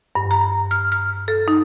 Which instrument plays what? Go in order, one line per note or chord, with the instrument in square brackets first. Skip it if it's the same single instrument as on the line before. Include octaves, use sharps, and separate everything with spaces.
[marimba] G2
A#5
F6
F6
A4
D#4